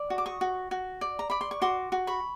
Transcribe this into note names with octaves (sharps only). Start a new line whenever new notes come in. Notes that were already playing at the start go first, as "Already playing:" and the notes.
Already playing: D5
F#4
D6
C#6 D#6
F#4
F#4
D5
A#5
D5 B5
C6
C#6
F#4 C6 D6
F#4
B5 C#6